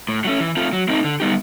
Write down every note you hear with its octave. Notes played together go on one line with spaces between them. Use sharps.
A2
F#3 A3 C#4
E3
A3 C4 F4
F#3
A3 C4 D#4
D3
G3 B3 D#4 G4